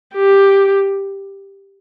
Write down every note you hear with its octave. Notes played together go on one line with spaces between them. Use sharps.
G4